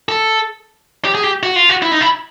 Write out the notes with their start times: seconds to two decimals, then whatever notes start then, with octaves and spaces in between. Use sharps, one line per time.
0.09 A4
1.05 G4
1.15 G#4
1.24 G4
1.43 F#4
1.56 F4
1.69 F#4
1.82 E4
1.92 D#4
2.01 E4